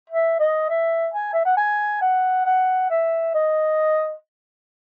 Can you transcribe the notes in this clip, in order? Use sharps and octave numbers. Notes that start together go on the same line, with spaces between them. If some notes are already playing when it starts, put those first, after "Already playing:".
E5
D#5
E5
G#5
E5
F#5
G#5
F#5
F#5
E5
D#5